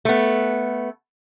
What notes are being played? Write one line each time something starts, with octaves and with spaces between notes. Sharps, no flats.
A3 B3